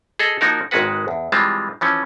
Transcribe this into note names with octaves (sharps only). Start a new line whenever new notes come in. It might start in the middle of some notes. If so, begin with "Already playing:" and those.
G#4 A4 D#5
F3 A#3 D#4 F#4 A#4
G#1 D#3 G#3 F#4 B4 F#5
E2
E3 G3 G#3 C4 F4 A5
E3 F3 C#4